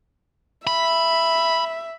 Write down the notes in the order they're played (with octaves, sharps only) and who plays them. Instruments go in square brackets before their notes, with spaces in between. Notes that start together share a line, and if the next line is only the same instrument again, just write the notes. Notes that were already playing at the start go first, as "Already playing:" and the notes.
[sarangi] E5 [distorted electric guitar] B5